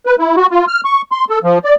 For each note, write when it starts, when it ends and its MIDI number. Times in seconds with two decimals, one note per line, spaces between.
0.06 0.15 71
0.19 0.36 64
0.37 0.47 66
0.51 0.65 65
0.68 0.81 89
0.85 1.02 85
1.12 1.25 84
1.30 1.39 69
1.44 1.59 53
1.65 1.75 74